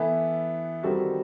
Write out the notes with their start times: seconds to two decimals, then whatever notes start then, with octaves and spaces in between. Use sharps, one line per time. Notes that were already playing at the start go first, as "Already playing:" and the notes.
Already playing: E3 B3 E4 A4
0.83 D#3 G3 C4 F#4 A4